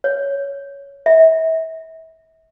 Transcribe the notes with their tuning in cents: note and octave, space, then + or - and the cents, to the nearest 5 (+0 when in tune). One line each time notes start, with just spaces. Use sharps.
C#5 +10
E5 -35